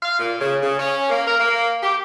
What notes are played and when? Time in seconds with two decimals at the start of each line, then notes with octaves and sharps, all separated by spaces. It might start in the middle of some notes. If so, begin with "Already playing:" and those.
0.03 F5
0.20 A#2
0.40 C#3
0.63 C#3
0.79 C#4
1.10 A#3
1.27 A#4
1.40 A#3
1.83 G4